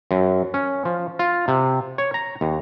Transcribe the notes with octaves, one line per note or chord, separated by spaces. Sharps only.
F#2
C#4
F3
F4
C3
C#5
A#5
D#2